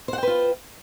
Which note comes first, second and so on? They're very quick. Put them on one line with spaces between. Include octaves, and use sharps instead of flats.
C5 F#5 G5 B4 F4